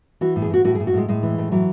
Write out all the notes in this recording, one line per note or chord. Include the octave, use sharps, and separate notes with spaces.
E3 F#4
A2
G#4
A2 F#4
A2 F#4
A2 G#4
F#4
A2 G#3
A2 G#3
E3
A2
E3 F#3